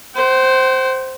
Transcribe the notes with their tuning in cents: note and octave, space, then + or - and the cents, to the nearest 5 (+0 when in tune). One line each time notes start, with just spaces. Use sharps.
C5 +0 G5 -45